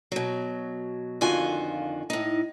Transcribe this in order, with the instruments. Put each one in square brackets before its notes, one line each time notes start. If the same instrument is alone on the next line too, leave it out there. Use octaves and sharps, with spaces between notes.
[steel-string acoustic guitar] B2 F#3
F2 D3 D#3 F4 F#4 G#5
A2 D#4